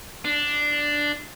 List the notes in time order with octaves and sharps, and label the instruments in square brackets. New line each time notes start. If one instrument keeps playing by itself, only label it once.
[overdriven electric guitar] D4